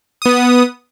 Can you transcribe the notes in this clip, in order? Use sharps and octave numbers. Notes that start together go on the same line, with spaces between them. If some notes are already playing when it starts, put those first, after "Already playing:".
B3 D#6